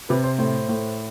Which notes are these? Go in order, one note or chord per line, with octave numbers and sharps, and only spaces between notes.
C3 B4
C5
A2 C5
A2